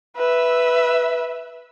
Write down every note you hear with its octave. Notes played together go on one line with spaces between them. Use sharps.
B4 E5